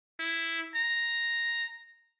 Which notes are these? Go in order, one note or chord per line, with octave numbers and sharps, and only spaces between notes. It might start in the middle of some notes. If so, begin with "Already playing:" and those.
E4
A#5